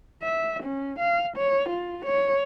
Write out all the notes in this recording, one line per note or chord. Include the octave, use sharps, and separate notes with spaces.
E5
C#4
F5
C#5
F4
C#5